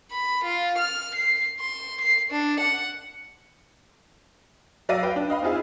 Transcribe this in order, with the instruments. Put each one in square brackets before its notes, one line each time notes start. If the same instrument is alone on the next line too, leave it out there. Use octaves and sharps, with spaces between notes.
[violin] B5
F4
F6
C7
C6
C7
D4
F#5
[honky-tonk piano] F#3 D5 E5 F5 A#6 D#7
B4 F5 G5
D4
D#5 F5 B5
C4 D#4 F4 G#4 E5